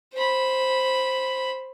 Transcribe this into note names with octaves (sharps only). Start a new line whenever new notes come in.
C5 B5